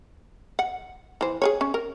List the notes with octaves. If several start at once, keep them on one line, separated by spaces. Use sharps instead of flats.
F#5
E3 C5
G#4 B4 C#5
C#4
A#4